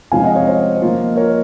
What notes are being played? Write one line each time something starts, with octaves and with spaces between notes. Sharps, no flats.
C3 F3 G#3 C#4 F5 G#5
D#5 F#5
C#5 F5
C5 D#5
F3 A#3 F4
A#4 C#5